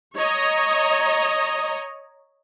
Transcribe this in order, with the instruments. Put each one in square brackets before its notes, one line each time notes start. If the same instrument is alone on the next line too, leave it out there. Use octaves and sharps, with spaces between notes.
[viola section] C#5 D#5 A#5